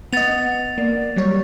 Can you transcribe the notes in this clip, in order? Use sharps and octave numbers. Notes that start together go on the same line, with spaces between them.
B3 D#5 F#5 A6 F7
A#3 D5
F#3 G3 C#5